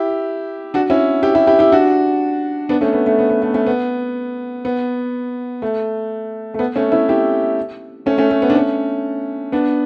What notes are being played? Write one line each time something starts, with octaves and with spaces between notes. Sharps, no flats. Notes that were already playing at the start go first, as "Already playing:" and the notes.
Already playing: E4 G4
D4 F#4
C#4 E4
E4 G4
E4 G4
E4 G4
E4 G4
D4 F#4
B3 D4
A3 C#4
B3
A3
B3
B3
A3
A3 C#4
B3
B3
A3
A3
B3
A3 C#4
C#4 E4
E4 G4
A3 C#4
A3 C#4
A3
B3
D4
A3 C#4
B3 D4